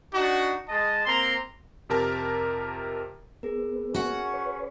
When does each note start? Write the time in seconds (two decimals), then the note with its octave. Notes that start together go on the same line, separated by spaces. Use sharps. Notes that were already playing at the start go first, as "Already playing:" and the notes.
0.14 D4 D#4 F#4
0.69 G#3 D#5 A5
1.06 A#3 C4 A#5 C6
1.89 F2 C3 G4 A#4 A5 A#5
3.43 B3 G#4 A#4
3.94 C#4 F#4 F#5
4.34 B4 C#5